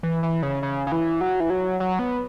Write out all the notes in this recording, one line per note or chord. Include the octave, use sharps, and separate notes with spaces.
E3
E3
C#3
C#3
C#3
E3
F#3
E3
F#3
F#3
B3